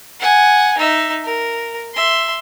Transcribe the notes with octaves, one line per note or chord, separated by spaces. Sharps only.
F#5 G#5
D#4 E5
A#4
E5 C6